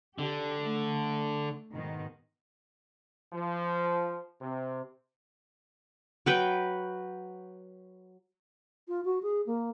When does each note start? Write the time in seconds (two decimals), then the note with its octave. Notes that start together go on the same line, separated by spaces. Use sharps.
0.19 D3 G4
0.59 A3
1.72 G#2 B2 D#3
3.32 F3
4.40 C3
6.26 F#3 B4 G5
8.88 F4
9.04 F#4
9.22 G#4
9.46 A#3